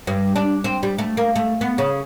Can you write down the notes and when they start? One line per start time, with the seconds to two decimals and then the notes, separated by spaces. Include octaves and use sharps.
0.07 G2
0.36 D4
0.64 C4
0.83 G3
0.98 A3
1.17 A#3
1.36 A3
1.61 B3
1.78 C#3